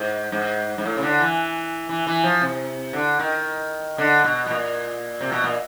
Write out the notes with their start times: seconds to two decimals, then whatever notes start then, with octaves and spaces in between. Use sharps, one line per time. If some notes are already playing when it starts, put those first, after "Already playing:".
Already playing: G#2
0.32 G#2
0.78 G#2
0.86 A2
0.97 C#3
1.03 D3
1.20 E3
1.89 E3
2.07 E3
2.24 F3
2.41 C3
2.93 D3
3.19 D#3
3.98 D3
4.24 B2
4.46 B2
4.51 A#2
5.21 C3
5.32 B2
5.44 A#2